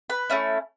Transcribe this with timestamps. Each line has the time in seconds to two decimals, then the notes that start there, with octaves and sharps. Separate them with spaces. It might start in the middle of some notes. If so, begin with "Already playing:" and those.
0.10 B4
0.30 A3 C#4 E4